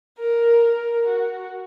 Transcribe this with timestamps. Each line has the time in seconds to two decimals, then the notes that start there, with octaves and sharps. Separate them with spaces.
0.19 A#4
0.63 A#4
1.07 F#4